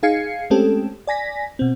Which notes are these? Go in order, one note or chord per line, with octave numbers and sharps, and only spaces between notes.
D#4 G#4 F5 G#6 C7 C#7
G#3 A3 C4 C#4 G4 A4
D5 G#5 A#6 B6
B2 C4